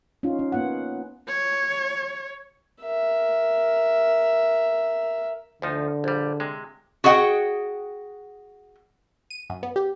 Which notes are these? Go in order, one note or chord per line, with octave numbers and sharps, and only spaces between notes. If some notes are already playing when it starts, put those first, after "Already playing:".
C#4 D#4 F4
C#4
A#3 B3 F4 F#5
C#5
A#4 E5
D2 D3 F3 D#4
A#1 G3
C3 G#3
F#4 G#4 D#5 F#5 G5
D#7
F#2
B3
G4